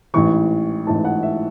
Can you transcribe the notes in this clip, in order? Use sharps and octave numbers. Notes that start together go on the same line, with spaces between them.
A1 G#2 E3 C#6
A1 G#2 E3 A5
F#5
E5